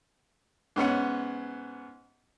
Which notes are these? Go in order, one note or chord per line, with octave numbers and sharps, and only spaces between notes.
G#2 B3 C#4 F#5